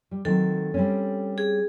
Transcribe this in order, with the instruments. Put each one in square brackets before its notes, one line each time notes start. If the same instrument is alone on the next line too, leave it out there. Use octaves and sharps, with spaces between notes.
[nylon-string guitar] G3
[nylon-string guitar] D#3 F#3 C4 [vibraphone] A4
[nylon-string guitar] G3 C4 C#4
[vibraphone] G#4